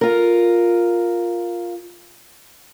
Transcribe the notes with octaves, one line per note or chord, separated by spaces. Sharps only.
F4 A#4